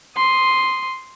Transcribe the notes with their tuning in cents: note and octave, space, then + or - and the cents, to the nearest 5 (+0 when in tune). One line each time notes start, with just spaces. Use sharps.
C6 +0 D#6 +0